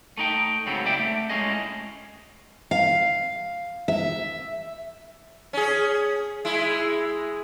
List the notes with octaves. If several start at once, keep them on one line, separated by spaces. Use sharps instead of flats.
A3 D#4 G5
G#2 C#3 F#3 B3 C4
D5 E5 G5
A3
A2 G#3 C#4 G#4 D#5
F5
E5
C#4 G#4
G#3 E4